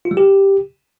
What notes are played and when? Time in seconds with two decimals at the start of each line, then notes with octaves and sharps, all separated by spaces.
0.05 F4
0.11 G3
0.17 G4